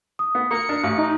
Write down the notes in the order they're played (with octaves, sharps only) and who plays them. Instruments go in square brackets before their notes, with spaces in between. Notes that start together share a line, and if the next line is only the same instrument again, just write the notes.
[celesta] D#6
[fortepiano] B3
[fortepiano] A#3 A#4 [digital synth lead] C#7
[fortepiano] D4 A#4 A#5
A1
[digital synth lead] D#4